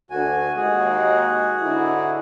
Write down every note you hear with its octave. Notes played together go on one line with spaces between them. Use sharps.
D2 F#4 G#5
D#2 G#3 F#4 G#4
G#2 D3 E4